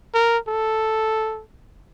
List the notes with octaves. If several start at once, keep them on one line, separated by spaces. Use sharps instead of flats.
A#4
A4